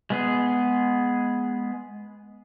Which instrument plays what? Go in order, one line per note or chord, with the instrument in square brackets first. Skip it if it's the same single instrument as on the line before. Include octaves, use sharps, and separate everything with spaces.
[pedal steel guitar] G#3 B3 G#4